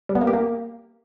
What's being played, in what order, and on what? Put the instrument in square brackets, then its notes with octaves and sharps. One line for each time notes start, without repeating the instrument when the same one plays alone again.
[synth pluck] G3
B3
A#3
G4
A#3